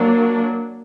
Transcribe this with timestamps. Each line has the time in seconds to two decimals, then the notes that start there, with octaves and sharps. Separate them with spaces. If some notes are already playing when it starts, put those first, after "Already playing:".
Already playing: F#3 A#3 D4